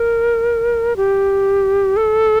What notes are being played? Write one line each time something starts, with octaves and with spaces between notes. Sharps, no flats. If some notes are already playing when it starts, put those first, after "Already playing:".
Already playing: A#4
G4
A4